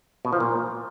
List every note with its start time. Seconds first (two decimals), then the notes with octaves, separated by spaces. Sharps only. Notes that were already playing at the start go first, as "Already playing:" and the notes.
0.25 B2
0.33 F3
0.40 A#2